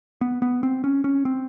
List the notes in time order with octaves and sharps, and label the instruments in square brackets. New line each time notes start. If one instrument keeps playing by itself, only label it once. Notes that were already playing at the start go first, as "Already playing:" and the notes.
[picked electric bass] B3
B3
C4
C#4
C#4
C4